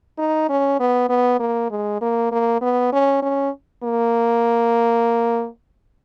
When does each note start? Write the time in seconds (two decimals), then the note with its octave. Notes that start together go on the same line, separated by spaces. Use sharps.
0.18 D#4
0.49 C#4
0.80 B3
1.09 B3
1.40 A#3
1.71 G#3
2.01 A#3
2.32 A#3
2.61 B3
2.93 C#4
3.22 C#4
3.83 A#3